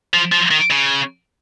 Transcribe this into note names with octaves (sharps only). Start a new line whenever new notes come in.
F3
F3
D#3
C#3